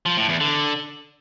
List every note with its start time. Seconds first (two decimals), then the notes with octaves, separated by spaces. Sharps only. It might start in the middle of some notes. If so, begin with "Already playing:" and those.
0.06 F3
0.17 A2
0.29 E2
0.41 D3